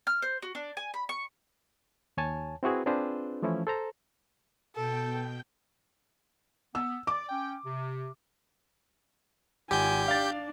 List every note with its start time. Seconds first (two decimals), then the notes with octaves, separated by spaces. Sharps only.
0.07 F6
0.22 C5
0.42 F#4
0.55 D4
0.77 G#5
0.94 B5
1.09 C#6
2.17 D#2 C#5 G#5 A5
2.63 C4 E4 F#4 G#4 B4
2.86 C4 D4 F4 G#4 B4 C5
3.42 E3 F3 A3 C#4 E4
3.67 A4 C5 A#5
4.76 B2 A4 G5 G6
6.75 B3 E6
7.07 D5 D6
7.29 C#4 G5
7.66 C3
9.71 G#1 F4 G4 G#5 G6
10.08 D4 D5 F5 A6